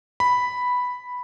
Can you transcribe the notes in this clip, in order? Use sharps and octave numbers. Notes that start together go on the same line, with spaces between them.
B5